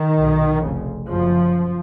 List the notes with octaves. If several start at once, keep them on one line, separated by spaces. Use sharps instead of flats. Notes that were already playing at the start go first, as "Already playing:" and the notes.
Already playing: D#3
B1 A#2
F1 F2 C#3
F#1 F#2 C#3 F3